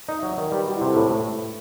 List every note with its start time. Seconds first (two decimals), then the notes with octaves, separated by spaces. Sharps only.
0.08 D#4 D#5
0.18 E5
0.23 F#3 D#5
0.38 D#3 D#5
0.52 G3 B4
0.67 G3 F#4
0.76 E4
0.81 C3 A4
0.96 A2 B4
1.11 A2